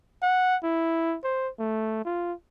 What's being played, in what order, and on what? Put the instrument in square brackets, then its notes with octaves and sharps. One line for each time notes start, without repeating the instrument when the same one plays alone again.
[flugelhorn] F#5
E4
C5
A3
F4